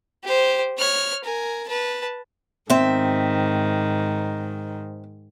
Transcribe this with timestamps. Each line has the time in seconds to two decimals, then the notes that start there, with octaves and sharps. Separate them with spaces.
0.24 G4 C5
0.78 C#5 F6
1.24 A#4 G#5
1.68 B4 A5
2.70 G#2 D#3 C4 E5